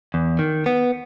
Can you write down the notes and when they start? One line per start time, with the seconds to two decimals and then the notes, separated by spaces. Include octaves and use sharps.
0.14 E2
0.39 D#3
0.66 B3